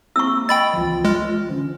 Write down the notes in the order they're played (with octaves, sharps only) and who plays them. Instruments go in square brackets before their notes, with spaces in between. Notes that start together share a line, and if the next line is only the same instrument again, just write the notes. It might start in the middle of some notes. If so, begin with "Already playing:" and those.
[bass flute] A#3 [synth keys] C4 E4 [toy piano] C#6 E6
[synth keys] D#5 [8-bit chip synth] G5 B5 A6
[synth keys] C#2 E3 F3 [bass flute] F4
[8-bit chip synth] G#3 [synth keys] F6
[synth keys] D3 E3 F3 [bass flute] C#4